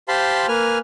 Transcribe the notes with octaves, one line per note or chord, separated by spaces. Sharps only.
G4 C5 F5 A5 B5 C6
A#3 B4 G#5 F6